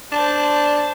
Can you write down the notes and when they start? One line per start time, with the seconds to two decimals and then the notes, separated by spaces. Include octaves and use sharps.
0.12 D4 C5 A5